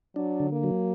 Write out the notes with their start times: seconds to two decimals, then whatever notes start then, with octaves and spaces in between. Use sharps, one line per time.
0.16 F#3 D4
0.40 D3
0.52 A#3
0.64 F#3